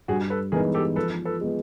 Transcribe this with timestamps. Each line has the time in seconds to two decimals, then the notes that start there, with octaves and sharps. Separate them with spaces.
0.08 G2 F#4 G#4
0.30 A4 B4
0.52 E3 G#3 B3 D#4 G#4 A#4
0.74 G4 A4
0.96 F3 A4 B4
1.25 A4 B4
1.41 G#3 B3